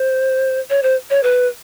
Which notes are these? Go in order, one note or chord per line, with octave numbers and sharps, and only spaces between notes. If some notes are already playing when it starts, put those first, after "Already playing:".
Already playing: C5
C#5
C5
C#5
B4